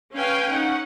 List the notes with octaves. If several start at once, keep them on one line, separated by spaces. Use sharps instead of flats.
C#4 B4 F5 G5 G#5
C#4 D#4 F#5